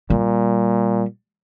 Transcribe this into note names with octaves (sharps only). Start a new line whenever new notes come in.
A#2 G3